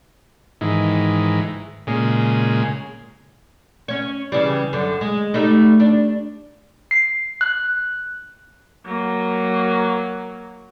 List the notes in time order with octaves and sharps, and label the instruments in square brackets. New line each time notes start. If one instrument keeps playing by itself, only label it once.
[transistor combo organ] G#2 D#3 E3
A#2 C#3 G#3
[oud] C#4 C#5
C#3 E3 G3
F#2 D3
G#3
G3 A3 D#4
D4
[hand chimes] C7
F#6
[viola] F#3 A#3